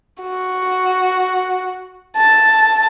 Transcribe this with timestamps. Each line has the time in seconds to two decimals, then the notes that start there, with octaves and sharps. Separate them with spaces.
0.23 F#4
2.17 A5